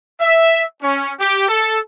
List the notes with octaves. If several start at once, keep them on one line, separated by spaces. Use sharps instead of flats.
E5
C#4
G4
A4